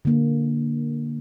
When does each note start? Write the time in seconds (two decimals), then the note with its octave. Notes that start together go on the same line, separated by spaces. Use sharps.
0.05 D3 A#3